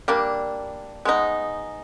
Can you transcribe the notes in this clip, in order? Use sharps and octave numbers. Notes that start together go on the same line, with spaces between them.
G3 A#3 D4
G#3 B3 D#4